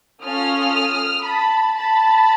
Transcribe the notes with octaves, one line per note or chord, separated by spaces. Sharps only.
C#4 F4 A4 D#6 F6
A5 B5
A5 B5